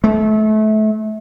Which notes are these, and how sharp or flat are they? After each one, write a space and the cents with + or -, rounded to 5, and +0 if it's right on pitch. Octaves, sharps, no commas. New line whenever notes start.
A3 -30